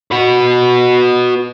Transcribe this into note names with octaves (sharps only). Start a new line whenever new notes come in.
F#4 B4